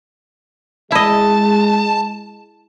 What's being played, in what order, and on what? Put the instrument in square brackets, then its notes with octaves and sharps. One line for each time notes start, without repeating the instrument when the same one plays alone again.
[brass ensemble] G#3 [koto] E4 D#5 [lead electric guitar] A5